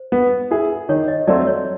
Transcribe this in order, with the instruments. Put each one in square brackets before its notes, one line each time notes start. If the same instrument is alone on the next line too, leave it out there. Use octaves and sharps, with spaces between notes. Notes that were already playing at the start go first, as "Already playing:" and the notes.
Already playing: [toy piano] C5
[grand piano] B3
E4 G#4
[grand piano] D#3 [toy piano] C#5
[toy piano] D#5
[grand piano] F#3 A3 C4 [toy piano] D5
[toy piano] C#5